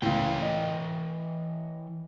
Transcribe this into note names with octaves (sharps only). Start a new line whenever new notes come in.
C#2 A2 E3 C#5 G5
D#5